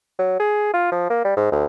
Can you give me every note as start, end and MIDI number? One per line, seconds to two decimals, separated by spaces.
0.19 0.37 54
0.40 0.72 68
0.73 0.88 65
0.92 1.06 53
1.10 1.22 58
1.24 1.34 55
1.37 1.51 44
1.52 1.66 38